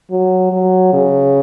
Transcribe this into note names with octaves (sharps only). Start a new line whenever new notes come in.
F#3
F#3
C#3